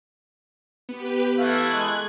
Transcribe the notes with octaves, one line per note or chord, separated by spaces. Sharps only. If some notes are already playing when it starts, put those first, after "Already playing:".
B3 G4 B4
E3 A3 E5 F5 F#6 G#6
G#3